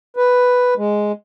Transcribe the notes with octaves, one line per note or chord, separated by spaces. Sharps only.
B4
G#3